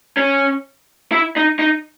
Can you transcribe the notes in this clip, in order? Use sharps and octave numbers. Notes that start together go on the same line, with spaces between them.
C#4
E4
D#4
D#4